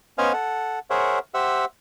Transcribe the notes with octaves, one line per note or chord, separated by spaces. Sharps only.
B3 C#4 C5 D#5 F5 G#5
A4 F#5
G#4 A#4 C5 C#5 E5 F#5
G4 C5 E5 F#5 E6